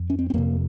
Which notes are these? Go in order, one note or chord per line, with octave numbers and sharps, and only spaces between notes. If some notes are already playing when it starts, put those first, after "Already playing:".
Already playing: F2
C#4
C4
C4
F2 C3 A#3